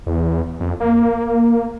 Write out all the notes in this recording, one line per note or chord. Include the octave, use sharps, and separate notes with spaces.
E2
F2
A#3